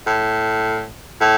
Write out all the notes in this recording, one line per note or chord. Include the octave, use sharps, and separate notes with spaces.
A2
A2